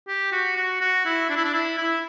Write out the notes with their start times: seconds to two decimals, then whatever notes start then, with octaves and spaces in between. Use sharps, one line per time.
0.08 G4
0.32 F#4
0.57 F#4
0.81 F#4
1.05 E4
1.30 D4
1.36 E4
1.44 D4
1.54 E4
1.78 E4